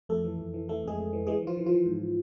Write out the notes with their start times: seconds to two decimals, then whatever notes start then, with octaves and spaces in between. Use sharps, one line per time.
0.09 F2 A3 A4
0.24 E3
0.39 F2
0.54 E3
0.68 E3 A3 A4
0.84 F2 G#3 G#4
0.98 F2
1.13 E3
1.27 E3 G#3 G#4
1.42 E3 F3 F4
1.57 E3
1.66 F3 F4
1.71 E3
1.86 G#2